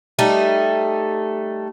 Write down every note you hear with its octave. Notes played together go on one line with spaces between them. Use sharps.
G3 A3 D#4